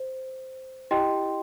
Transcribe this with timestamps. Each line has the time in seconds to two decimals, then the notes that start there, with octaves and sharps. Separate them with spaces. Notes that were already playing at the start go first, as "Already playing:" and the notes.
Already playing: C5
0.91 E4 G4 D#5 G5 C6